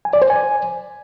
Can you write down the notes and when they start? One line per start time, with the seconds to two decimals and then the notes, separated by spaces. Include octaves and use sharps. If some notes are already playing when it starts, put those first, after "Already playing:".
0.05 G#5
0.13 D5
0.22 C5
0.30 G#5